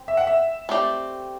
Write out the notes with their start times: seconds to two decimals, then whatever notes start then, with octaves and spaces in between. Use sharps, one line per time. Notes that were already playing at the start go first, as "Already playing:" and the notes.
Already playing: C4
0.08 E5
0.17 F#5
0.27 E5
0.69 A3 C4 G4 D5